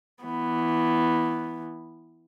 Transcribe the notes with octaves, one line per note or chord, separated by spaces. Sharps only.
E3 B3